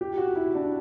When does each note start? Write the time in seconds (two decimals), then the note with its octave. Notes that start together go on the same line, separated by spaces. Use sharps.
0.01 G4
0.18 F#4
0.36 E4
0.55 D4